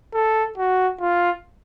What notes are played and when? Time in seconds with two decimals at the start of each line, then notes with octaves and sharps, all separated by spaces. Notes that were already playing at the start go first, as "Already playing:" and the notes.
0.14 A4
0.58 F#4
1.00 F4